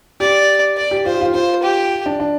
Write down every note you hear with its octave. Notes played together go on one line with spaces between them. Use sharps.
G4 D5
D5
G4
F4 C5
G4
F4
F4 C5
G4
D4
D4